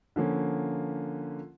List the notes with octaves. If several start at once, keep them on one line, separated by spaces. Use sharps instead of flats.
D3 F3 A#3 C#4